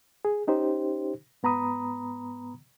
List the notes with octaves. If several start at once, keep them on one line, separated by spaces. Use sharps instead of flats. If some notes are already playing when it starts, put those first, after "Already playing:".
G#4
C#4 D#4 G4 C5
G#2 B3 A#5 B5 D#6